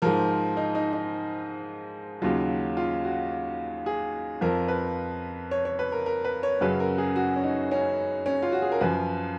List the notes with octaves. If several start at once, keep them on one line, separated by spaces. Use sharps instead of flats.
G#2 F3 A#4
D#4
D#4
D#4
D#2 C#3 F#3 F4
F4
F#4
G#4
F2 F3 A#4
B4
C#5
C#5
B4
A#4
A#4
B4
C#5
F#2 C#3 F#3 B4
A#4
G#4
F#4
C#4
D#4
C#4
C#4
F4
F#4
G#4
A#4
F#2 F3 B4